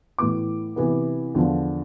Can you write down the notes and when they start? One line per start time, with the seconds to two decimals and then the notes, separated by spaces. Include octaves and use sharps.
0.19 A2 E3 B3 E4 D6
0.76 C3 E3 B3
1.35 E2 D3 F3